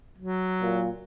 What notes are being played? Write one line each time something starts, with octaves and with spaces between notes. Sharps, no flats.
F#3
A#2